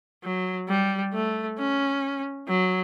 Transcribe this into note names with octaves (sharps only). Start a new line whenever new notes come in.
F#3
G3
A3
C#4
F#3